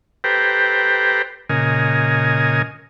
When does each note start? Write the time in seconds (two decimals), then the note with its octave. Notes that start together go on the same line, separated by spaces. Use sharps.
0.24 G4 A4 B4 C5 G5 A#5
1.49 A#2 C#3 A#4 D#5 G#5